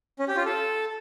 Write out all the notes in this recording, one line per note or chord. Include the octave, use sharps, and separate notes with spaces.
C#4
G4
F4
A4